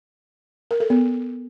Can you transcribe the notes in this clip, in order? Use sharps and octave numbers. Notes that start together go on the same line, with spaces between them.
A#4
A4
B3